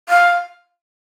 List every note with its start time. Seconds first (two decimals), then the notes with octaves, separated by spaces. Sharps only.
0.09 F5